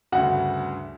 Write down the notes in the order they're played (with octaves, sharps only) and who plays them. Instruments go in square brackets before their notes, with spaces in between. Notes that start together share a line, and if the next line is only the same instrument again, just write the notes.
[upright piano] D2 G2 C#3 [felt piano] F#4 F#5